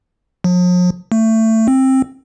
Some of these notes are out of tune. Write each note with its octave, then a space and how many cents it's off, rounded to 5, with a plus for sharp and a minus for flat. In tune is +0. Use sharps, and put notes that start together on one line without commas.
F3 +45
A3 +20
C4 +15